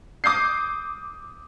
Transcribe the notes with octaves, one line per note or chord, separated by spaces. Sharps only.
D6 D#6 G6 C7